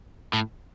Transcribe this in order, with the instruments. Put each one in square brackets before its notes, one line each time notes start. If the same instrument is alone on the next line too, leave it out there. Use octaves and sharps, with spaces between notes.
[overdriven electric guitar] A2